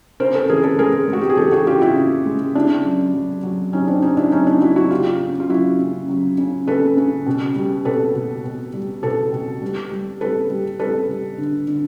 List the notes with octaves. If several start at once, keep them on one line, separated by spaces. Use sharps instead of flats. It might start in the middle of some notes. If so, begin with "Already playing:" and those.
C#3 A#4 C5
A4 B4
E3 G#4 A#4
A4 B4
G#3 G#4 A#4
G#3
F#4
G4
G#4
E3 G4 A4
F#4 G#4
C#3 F4 G4
E4 F#4
C#3
G#3
C#3 D4 E4
F#3
F#3
F#3
F#3 C#4 D#4
C4 D4
C#3 C#4 D#4
D4 E4
F#3 C#4 D#4
D4 E4
F#3 E4 F#4
E4 F#4
C#3 F4 G4
C#3
F4
F#3 E4 F#4
C#3
F#3
C#3
C#3 A4 B4
C#3
B2
G3
B2 A4 B4
B2
B2
G3
B2 A4 B4
B2
G3
G3
G3 A4 B4
G3
G3 A4 B4
G3
D3
D3